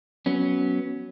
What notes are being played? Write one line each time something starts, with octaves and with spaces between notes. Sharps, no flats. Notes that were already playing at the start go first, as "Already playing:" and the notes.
F#3 B3 C#4